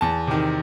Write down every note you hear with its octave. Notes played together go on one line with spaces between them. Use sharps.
E2 A5
C3 D#3